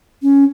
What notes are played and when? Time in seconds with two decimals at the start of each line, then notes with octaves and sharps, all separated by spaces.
0.22 C#4